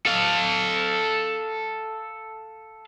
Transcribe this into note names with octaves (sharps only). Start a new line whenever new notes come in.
A4 F5